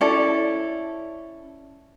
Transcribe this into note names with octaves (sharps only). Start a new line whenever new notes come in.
C#4 E4 A4 D5